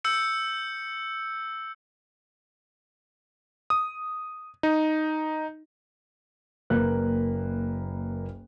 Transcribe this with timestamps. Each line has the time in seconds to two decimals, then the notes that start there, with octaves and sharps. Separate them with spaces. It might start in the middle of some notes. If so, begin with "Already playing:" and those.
0.04 E6 G6 C#7
3.70 D#6
4.63 D#4
6.70 F#1 A#3 A#4 B4 F#6